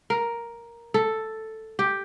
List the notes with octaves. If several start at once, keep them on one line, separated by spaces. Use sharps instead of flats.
A#4
A4
G4